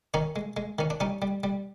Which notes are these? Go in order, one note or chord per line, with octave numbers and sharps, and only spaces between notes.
D#3 C#4 D#4
G#3
G#3
D#3 C#4
D4
G3 C#4 D#4
G3
G3